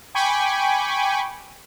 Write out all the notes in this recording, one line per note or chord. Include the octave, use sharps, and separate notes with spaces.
G5 G#5 B5 C#6 D6